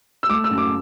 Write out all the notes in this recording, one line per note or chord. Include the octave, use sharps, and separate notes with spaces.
E6
A3 D6
E6
F#2
D6